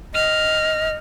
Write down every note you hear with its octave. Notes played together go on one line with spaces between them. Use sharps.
D#5 F6